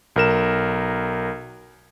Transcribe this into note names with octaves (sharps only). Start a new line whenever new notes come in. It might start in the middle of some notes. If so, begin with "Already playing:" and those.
B1 A#4 E7